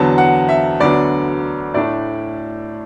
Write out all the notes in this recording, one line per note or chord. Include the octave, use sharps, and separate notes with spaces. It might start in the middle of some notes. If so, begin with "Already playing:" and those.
Already playing: E2 D3 F#3 B3 A5
F#5
E5
D2 D3 F#3 B3 D4 D5
A2 A3 D4 D5